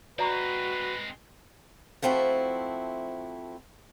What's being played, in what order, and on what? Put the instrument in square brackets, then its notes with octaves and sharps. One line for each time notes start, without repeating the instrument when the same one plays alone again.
[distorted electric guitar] G#3 C4 [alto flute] F#4 [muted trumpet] B4 [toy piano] D5 A#5 C#6
[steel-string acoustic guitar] F3 A3 C4 E4 F#4